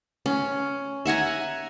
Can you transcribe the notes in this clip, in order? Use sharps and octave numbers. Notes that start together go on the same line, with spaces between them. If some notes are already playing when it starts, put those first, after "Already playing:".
C#4
E5 F#5 G#5 A#5